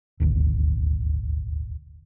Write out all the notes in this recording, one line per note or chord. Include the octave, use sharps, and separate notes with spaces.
D#1 G#1 D2